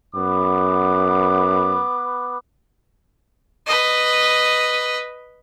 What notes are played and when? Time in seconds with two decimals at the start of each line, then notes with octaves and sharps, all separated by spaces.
0.16 F#2 B3 B4 D6
3.67 B4 D#5